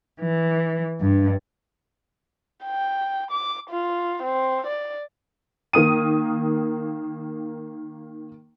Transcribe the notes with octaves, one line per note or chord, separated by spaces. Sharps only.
E3
G2
G5
D6
F4
C4
D5
D#3 A#3 D#6 D#7